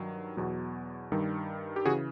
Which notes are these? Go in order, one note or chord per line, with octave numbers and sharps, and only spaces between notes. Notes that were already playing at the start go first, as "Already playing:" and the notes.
Already playing: G2 D#3 F#3
E2 B2 F#3
G2 D#3 G3
G4
C#3 E3 F#4 G#4